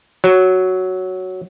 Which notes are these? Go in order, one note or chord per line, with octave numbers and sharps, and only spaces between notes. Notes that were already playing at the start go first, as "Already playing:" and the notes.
F#3